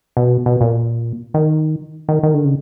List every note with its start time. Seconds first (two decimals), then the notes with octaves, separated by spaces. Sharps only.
0.17 B2
0.46 B2
0.61 A#2
1.34 D#3
2.09 D#3
2.23 D#3
2.34 D3
2.45 C#3